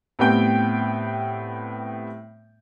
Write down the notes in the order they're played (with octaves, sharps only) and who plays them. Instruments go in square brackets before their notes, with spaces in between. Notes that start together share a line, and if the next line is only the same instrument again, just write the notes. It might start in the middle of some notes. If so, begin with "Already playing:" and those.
[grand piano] A2 G3 B3 C4 G5 G6